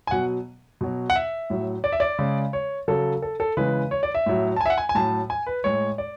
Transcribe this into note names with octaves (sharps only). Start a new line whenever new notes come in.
G#5
B2 F#3 F#5
B2 F#3
F#5
E5
A2 F#3
D5
E5
D5
C#3 G#3
C#5
C#3 F#3 A4
A4
A4
C#3 E3 G#3 B4
C#5
D5
E5
A2 F#3
A5
G#5
E5
F#5
G#5
G#5
A2 F#3 A5
G#5
B4
A2 G#3 C#5
D5